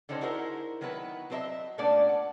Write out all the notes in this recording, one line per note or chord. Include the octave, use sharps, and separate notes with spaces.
D3 D#3 C#4 D#4 C5
D#4 E4 F#4 G#4 A#4 C5
D#3 F#3 B3 E4 B4
F#3 C4 A#4 C5 D#5 E5
A#2 A3 B3 C#4 D4 D5
F#5